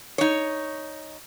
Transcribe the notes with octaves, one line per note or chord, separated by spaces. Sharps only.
D#4 C#5